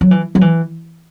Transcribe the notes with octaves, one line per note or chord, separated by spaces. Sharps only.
F#3
E3
F#3
E3